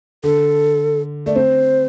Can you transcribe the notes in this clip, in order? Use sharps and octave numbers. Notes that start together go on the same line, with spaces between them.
D3 A4
A3 D5
C4 C5